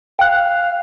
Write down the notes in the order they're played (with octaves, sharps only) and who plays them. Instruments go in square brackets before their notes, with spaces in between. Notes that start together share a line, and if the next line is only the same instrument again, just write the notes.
[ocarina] F5 [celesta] G5 F#6